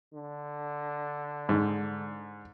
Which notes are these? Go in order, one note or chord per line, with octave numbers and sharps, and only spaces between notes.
D3
G#2